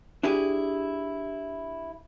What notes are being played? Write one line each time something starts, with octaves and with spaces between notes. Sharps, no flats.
D4 E4 G4 G#4